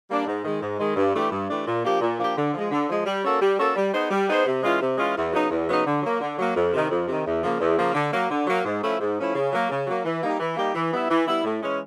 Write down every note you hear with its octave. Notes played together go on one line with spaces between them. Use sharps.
G3 A#3 D4
G#2
D#3 G#3
G#2
D#3 G#3
G2
E3 A3 D4 G4
G2
E3 A3 D4 G4
A#2
F3 A#3 D4 G4
A#2
F3 A#3 D4 G4
D3
F3 G#3
D3
F3 G#3
G3
A#3 C#4 F#4 A4
G3
A#3 C#4 F#4 A4
G3
B3 D#4 G#4 C5
G3
B3 D#4 G#4 C5
C3
E3 G#3 C#4 F4
C3
E3 G#3 C#4 F4
E2
C#3 F#3 B3 D#4
E2
C#3 F#3 B3 D#4
D3
F#3 A#3
D3
F#3 A#3
F2
C3 D#3
F2
C3 D#3
E2
C#3 F3 A#3
E2
C#3 F3 A#3
D3
F#3 A#3
D3
F#3 A#3
G#2
F3 A3 C#4 E4
G#2
F3 A3 C#4 E4
C#3
F#3 A#3
C#3
F#3 A#3
E3
G3 A#3 D#4 G4
E3
G3 A#3 D#4 G4
E3
G3 B3 E4
E3
G3 B3 E4
A2
E3 G#3 C#4